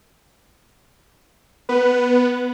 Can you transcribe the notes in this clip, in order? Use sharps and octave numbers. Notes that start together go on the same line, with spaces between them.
B3 B4